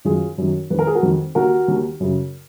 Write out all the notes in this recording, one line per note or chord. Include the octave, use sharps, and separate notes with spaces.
F#2 D#3 F4 G#4
F#2 D#3
F2 D#3 A#4 B4
G#4
F#4 A#4
F2 D#3
D#2 D#3 F#4 A#4
D#2 D#3
F#2 C#3